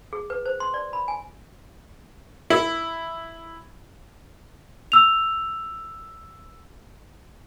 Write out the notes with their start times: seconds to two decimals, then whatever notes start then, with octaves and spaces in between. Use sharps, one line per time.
0.13 G#4
0.30 B4
0.46 C5
0.60 C6
0.74 D5
0.93 B5
1.08 G#5
2.50 E4
4.92 E6 F7